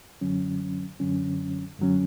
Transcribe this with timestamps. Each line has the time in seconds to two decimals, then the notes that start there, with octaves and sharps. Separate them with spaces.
0.21 F#2 D3 F#3 C#4
1.00 F#2 D3 F#3 C#4
1.79 F#2 D3 F#3 C#4